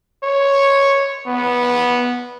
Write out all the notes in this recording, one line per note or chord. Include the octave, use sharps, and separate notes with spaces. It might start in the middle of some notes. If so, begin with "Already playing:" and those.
C#5
B3